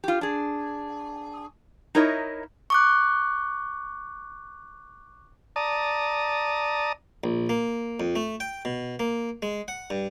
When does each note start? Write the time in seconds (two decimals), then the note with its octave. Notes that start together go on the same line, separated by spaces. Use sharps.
0.04 F4 G4
0.21 D4 G#4
1.95 D#4 E4 A#4 C#5 D#5 E5
2.70 C#6 D6 F#6
5.56 D5 A5 A#5 D#6
7.24 A#1
7.49 A#3
8.00 F2
8.16 A3
8.40 G5
8.65 B2
9.00 A#3
9.42 G#3
9.68 F#5
9.90 G2